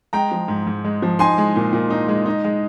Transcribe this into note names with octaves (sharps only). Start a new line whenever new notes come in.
G#3 G5 A#5
F3
G#2
G#2
G#3
F3
D#4 G#5 C6
G#3
A#2
A#2
D#4
G#3
D#4
G#3